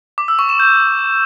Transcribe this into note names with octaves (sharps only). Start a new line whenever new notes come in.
D6
E6
C#6
E7
G6